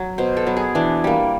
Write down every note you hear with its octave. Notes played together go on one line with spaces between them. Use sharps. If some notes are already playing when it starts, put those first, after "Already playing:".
Already playing: F#3
B2 C5
A4
F#3 B3
G#4
E3 D4
G3 A#3